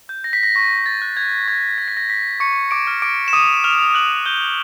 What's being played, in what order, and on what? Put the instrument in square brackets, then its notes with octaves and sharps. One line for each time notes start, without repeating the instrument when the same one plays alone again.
[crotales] G6
A#6
B6
A#6
C#6 A#6
A6
F#6
G#6
C#6 G#6
A#6
B6
F#6 A#6
B6
C#6 D6 C#7
D6 D7
F6
D6 D7
E7
D6 D#6 D#7
F6 F7
F6
F#6 F#7
D#6 G6 G7